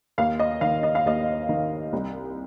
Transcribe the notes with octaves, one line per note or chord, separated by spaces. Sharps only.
D#2 F5
D#5
D#3 F5
D#5
F5
D#2 D#5
D#3
C2